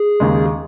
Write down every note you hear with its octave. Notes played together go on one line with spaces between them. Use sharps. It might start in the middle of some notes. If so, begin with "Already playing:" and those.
Already playing: G#4
D#2 C#3 G#3